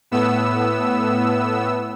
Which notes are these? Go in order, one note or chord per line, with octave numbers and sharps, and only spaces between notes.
A2 B3 E6